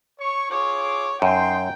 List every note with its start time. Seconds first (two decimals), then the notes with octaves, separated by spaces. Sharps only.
0.19 C#5 C#6
0.50 F4 G#4 C#5 D6
1.22 F#2 D#4 G5 C6